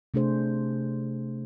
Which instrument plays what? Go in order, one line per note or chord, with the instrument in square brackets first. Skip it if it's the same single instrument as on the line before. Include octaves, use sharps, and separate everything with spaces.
[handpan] C3 A3 D4 G#4 C5